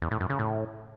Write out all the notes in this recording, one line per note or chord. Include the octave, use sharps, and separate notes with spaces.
E2
A2
F#2
C#3
A2